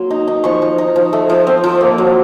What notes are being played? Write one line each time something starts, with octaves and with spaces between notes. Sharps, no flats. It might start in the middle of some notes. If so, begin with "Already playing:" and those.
Already playing: F#3 A#3 C6
D#4
D#4
F3 C#6
F3
D#4
F3
A3
F3
C4
F3
A#3
F#3